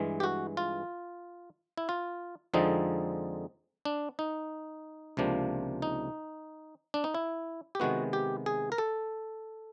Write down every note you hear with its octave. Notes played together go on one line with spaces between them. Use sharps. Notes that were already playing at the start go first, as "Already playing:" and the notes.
Already playing: G2 E3 G#3
G4
F#4
F4
E4
F4
F2 D3 F3 G#3 C4 D#4
D4
D#4
C#2 C3 F3 A#3 D4
D#4
D4
D#4
E4
G4
C3 D#3 G#3 B3 F#4
G4
G#4
A#4
A4